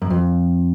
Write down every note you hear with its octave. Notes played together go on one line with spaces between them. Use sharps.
F#2
F2